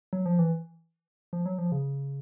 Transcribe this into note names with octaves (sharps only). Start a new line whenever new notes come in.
F#3
F3
E3
F3
F#3
F3
C#3